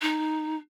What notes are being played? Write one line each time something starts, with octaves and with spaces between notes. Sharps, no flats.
D#4